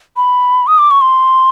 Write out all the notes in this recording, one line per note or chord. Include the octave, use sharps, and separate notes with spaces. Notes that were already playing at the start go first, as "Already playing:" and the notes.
B5
D#6
D6
C#6
C6